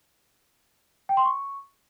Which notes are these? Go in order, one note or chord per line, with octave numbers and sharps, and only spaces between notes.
G5
C6
C#6